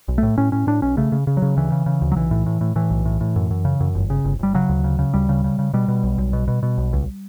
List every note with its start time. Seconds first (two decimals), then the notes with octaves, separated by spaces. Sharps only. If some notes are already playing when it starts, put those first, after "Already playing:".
0.08 B1
0.18 A2 A3
0.38 A2 C#4
0.52 A2 C#4
0.67 A2 D4
0.82 B1 C#4
0.97 C#3 A3
1.12 C#3
1.27 C#3
1.37 F#3
1.42 C#3
1.57 D2 E3
1.72 C#3
1.86 C#3
2.02 D2
2.12 F#3
2.16 B1 E3
2.31 A2
2.46 A2
2.61 A2
2.76 A2 E3
2.91 B1
3.05 A2
3.21 A2
3.36 F#2
3.51 F#2
3.65 C#3
3.80 F#2
3.95 G1
4.10 C#3
4.24 G1
4.39 G1 G3
4.54 C#3 F#3
4.69 D2
4.84 C#3
4.99 C#3
5.14 D2 G3
5.29 C#3
5.44 C#3
5.59 C#3
5.74 B2 G3
5.88 B2
6.03 B1
6.18 B1
6.33 B2
6.48 B2
6.63 B2
6.78 B1
6.93 C#2